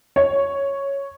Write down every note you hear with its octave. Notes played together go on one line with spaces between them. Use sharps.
C#5